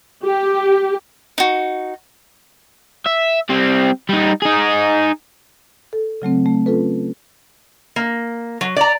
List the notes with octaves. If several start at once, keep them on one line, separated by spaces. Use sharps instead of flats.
G4
D#4 F#4
E5
G3 C4
G3 D#4
D#4 G#4
A4
C#3 F#3 A3 C4
A3
C#4 F4 A4 B4
A#3
F#3
D5 A#5